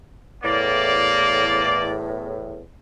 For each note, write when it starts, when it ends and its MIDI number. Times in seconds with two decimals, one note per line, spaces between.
0.43 2.61 40
0.43 2.61 45
0.43 1.92 58
0.43 1.92 74